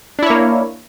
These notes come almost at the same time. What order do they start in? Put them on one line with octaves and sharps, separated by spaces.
D4 E4 C#5 A#3